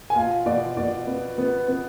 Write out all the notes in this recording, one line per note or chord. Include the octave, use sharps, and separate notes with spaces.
G#5
B2 F4 F5
B2 D5
B2 D5
B3
B3
B3